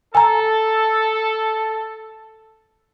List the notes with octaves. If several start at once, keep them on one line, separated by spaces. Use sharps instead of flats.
A4 G#5 A#5